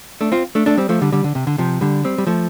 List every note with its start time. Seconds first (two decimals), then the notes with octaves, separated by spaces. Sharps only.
0.21 A3 D4
0.32 C4 F4
0.55 A3 D4
0.66 A3 D4
0.77 G3 C4
0.89 F3 A3
1.02 D3 G3
1.12 D3 G3
1.24 D3
1.35 C3
1.47 D3
1.58 C3 F3
1.81 D3 G3
2.04 G3 C4
2.18 G3
2.27 F3 A3